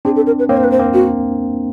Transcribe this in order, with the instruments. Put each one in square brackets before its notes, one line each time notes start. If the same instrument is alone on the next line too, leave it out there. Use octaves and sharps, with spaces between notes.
[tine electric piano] C4 D4 [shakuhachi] G#4
[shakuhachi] A4
A#4
B4
[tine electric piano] A#3 C4 [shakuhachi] C#5
[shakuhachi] C5
B4
C5
[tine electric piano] A#3 C4
[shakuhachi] F#4